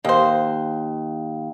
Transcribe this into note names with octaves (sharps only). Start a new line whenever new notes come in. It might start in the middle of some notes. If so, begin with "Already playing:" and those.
D#2 A#3 C5